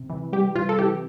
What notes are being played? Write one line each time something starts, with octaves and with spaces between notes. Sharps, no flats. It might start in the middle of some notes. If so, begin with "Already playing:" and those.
Already playing: C3
E3
G3 G4
C3 F4
A4
E3 G4